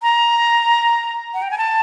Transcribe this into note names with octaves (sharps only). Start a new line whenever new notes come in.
A#5
F#5
G5
G#5
A5